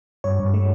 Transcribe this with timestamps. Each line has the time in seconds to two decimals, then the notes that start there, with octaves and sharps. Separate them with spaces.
0.24 G2 C#5
0.39 G2
0.54 A3